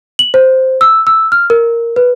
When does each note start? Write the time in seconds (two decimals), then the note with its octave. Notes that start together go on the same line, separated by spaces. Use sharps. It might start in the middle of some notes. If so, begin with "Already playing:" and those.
0.19 F#7
0.34 C5
0.81 E6
1.07 E6
1.32 F6
1.50 A#4
1.96 B4